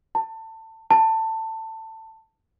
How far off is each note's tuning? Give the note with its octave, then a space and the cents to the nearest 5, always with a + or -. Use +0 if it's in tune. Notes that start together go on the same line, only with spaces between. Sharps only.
A5 +25
A5 +20